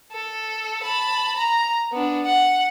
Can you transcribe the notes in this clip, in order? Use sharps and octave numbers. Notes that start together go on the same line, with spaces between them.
A4
A5 B5
A#5
B3 D4
F#5